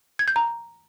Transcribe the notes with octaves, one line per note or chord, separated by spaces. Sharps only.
G#6
G6
A#5